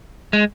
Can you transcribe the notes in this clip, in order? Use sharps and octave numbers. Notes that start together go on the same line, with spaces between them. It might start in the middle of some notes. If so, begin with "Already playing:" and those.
G#3